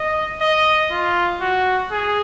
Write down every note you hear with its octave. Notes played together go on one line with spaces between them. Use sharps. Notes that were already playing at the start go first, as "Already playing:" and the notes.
Already playing: D#5
D#5
F4
F#4
G#4